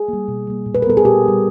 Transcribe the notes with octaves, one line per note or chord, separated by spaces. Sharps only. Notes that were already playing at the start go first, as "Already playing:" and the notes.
Already playing: G#4
G3 A#3
B2
G3 A#3
A#2
B4
A#4
G3 B3 A4
G#4
A#2 G4
G3 B3